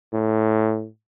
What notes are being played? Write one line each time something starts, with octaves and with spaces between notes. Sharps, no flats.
A2